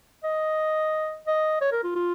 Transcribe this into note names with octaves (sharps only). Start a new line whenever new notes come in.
D#5
D#5
C#5
A#4
F4
F4